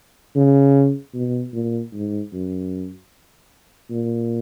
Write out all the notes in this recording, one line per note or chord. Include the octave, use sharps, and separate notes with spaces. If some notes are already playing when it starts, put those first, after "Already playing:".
C#3
B2
A#2
G#2
F#2
A#2